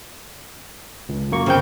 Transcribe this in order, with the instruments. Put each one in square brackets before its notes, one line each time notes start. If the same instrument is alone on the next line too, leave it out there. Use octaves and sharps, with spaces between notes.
[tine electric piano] C#2
F#2 A#3 C#6
[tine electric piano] G1 C4 G6 [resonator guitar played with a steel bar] C#3 G5